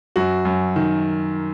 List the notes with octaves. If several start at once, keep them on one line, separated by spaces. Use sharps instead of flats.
F#2 F#4
F#2
D#3